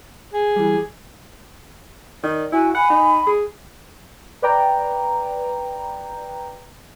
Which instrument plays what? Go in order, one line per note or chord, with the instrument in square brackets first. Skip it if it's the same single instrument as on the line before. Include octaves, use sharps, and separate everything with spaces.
[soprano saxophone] G#4
[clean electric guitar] E3 G3
[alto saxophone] D#3 [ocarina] D5
[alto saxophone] E4 [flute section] F#4 [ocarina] G#5
[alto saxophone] F#5 [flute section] G#5 [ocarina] B5
[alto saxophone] D#4
G#4
[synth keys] B4 D5 G5 A#5